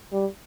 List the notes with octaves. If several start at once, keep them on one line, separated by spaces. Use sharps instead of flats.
G3